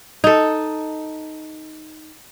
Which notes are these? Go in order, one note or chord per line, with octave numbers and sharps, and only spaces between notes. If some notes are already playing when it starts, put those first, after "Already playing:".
D#4 A4